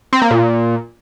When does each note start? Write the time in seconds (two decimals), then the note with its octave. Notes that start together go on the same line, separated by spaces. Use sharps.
0.13 C4
0.22 A#3
0.31 A#2